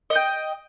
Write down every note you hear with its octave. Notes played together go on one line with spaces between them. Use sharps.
D#5 F#5 G5